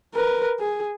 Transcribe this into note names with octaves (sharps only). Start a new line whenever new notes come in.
A#4 B4
G#4